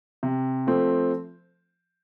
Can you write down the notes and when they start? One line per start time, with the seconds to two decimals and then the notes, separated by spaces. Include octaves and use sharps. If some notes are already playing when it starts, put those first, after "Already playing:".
0.23 C3
0.67 F3 A3 C4